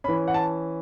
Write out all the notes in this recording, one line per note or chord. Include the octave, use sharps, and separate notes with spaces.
E3 C#4 B5
F#5
A5